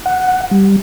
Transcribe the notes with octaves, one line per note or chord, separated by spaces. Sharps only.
F#5
G3